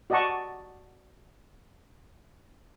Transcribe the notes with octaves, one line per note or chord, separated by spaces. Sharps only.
F#4 D5 D#5 F#5 A5 C#6